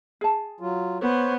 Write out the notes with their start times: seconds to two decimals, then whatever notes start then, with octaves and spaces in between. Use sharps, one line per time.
0.21 G#4 A5
0.60 F#3 F4
1.01 B3 C5 C#5